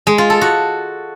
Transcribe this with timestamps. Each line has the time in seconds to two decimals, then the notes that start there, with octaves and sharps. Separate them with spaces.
0.07 G#3
0.18 F4
0.30 A4
0.41 F#4